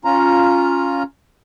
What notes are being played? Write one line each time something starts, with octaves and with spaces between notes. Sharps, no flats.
C#4 F4 A#5